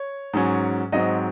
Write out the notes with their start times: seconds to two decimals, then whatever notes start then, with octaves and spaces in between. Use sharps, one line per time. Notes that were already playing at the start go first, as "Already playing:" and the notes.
Already playing: C#5
0.33 G#2 F#3 C#4
0.92 G#2 F#3 C4 D#5